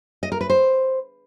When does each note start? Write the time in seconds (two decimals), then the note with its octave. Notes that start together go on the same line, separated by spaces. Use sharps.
0.23 D#5
0.32 A#4
0.41 B4
0.50 C5